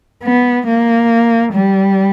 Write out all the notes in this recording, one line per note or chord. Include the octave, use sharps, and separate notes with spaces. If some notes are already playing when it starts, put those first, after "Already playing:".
B3
A#3
G3